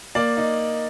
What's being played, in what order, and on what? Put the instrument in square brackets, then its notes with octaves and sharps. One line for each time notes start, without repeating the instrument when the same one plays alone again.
[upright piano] A#3 D5
D#4